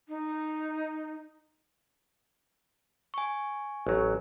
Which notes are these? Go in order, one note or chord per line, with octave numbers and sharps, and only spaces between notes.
D#4
G#5 C#6
A1 F#3